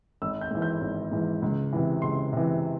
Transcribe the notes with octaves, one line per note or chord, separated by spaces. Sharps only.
G#1 E6
G6
G#2 E3
G6
G#1
G#2 E3
C#2
C3 E3
C#2 C6
C3 E3